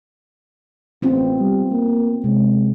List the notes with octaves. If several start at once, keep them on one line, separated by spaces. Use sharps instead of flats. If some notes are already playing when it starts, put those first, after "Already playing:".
A1 B3 C4 F4
G3
A#3
C3 G#3